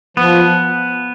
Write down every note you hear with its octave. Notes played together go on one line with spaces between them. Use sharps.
F3 B3